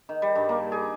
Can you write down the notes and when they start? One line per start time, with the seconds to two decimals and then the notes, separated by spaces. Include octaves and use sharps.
0.09 D#3
0.22 G3
0.35 G2
0.49 A#3
0.72 G#4